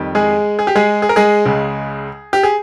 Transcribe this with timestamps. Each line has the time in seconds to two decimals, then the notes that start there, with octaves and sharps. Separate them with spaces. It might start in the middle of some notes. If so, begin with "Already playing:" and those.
Already playing: F2 D#3 G3
0.15 G#3 G#4
0.59 G#4
0.67 G4
0.75 G#3 G#4
1.02 G#4
1.09 A#4
1.16 G#3 G#4
1.45 C#2 C#3 G#3
2.33 G4
2.43 G#4